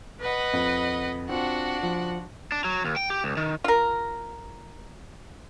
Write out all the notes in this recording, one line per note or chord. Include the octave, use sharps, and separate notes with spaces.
B4 D#5 F#5
F2
C4 D4 F4 F#4 F#5
F3
D4
F#3
D#2
G5
G4
C#2
D#3
F4 A#4